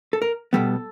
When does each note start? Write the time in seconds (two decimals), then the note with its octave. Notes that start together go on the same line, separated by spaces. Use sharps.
0.13 A4
0.22 A#4
0.53 B2 G3 B3 A4